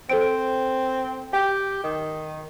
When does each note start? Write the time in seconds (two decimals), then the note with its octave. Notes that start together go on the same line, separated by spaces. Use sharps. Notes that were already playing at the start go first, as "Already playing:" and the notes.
0.10 C4 A4 C5 D7
1.33 G4 G5
1.84 D#3